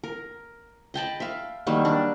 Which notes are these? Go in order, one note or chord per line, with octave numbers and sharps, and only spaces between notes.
A#4
D#5 G5 A5 B5
E5 F5
D#3 F#3 G3 A#3
D4